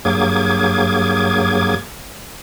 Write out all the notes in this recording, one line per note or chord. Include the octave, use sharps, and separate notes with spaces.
G2 F#3 A#3 G#4 D6 G#6